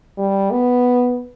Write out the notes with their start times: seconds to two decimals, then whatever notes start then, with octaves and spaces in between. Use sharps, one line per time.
0.18 G3
0.51 B3